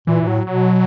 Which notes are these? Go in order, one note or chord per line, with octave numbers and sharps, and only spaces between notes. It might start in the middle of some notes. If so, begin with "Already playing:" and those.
A#2 E3
A#2
A2 F#3
B2 F#3